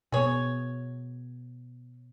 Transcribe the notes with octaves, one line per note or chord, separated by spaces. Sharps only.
B2 B3 G#4 C#5